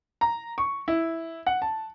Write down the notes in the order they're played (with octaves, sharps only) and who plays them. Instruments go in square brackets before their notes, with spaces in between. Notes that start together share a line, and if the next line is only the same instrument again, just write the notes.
[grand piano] A#5
C#6
E4
F#5
A5